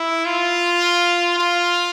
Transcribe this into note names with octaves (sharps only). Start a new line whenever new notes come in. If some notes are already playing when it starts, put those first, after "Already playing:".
Already playing: E4
F4
F4